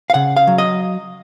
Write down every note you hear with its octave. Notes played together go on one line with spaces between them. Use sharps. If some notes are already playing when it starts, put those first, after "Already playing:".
F5
C#3 F#5
F5
F#3
D#5